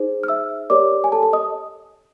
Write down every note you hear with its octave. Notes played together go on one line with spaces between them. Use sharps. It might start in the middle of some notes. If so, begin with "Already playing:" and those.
Already playing: D#4 G#4 C5
F6
E5 E6
G4 A#4 C#5 D5 D6
G#5
A4 A5
A4 A5
D#5 D#6